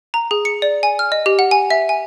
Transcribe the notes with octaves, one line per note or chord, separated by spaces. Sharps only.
A#5
G#4
C#7
D5
G#5
F6
D#5
G4
F#5
G#5
E5
G#5